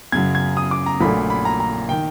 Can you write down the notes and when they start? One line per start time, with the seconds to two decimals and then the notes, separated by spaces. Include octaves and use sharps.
0.12 F#2 C#3 F#3 G#6
0.35 G#6
0.57 D#6
0.71 D6
0.86 A#5
1.01 A#1 A#2 F#3 A3 B5
1.30 B5
1.45 A#5
1.60 A#5
1.89 D#3 G5